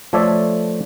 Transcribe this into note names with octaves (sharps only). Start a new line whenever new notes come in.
F3 A3 A4 C#5 D5 E5